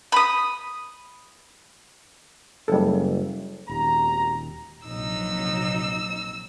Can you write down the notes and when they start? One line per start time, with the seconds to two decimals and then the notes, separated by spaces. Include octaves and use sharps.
0.12 B5 D#6
2.68 F#1 G3 A4
3.69 D#1 G#1 G4 A#5
4.87 A#1 F2 C3 F#3 D#4 E6